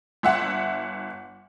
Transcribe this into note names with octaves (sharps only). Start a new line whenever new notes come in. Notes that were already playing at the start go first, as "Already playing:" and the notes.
G1 E5 F#5